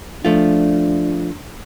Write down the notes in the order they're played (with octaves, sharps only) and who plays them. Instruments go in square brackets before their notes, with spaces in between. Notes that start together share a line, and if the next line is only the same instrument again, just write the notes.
[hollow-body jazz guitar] F3 A3 F4 [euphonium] D4